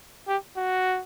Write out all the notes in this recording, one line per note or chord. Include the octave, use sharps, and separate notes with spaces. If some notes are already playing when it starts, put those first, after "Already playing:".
G4
F#4